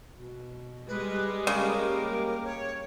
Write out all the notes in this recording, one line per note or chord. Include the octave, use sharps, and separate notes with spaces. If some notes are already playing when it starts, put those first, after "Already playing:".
B2
G3 G#3 B4
C#3 A#3 G4 A#4
C#5